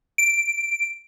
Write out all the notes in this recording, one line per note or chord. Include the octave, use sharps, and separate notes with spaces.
D7